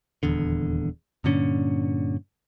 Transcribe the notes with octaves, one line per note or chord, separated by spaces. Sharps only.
D#1 E2 D3
G2 A#2 D3 C#4